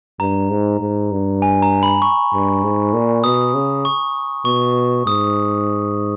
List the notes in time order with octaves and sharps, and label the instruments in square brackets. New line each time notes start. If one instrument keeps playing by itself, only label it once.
[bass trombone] G2 [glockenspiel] A#5
[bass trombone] G#2
G#2
G2
[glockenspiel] G#5
A#5
B5
C#6
[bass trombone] G2
G#2
A#2
[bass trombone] B2 [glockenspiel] D#6
[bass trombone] C#3
[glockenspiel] C#6
[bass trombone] B2 [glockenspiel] C#6
[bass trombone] G#2 [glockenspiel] D#6